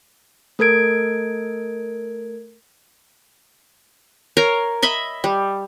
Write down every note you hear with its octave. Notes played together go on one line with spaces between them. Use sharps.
A3 A4 A#4 G#6 D7
A#4 C#5 F5 A#5
D#5 E5 B5
G3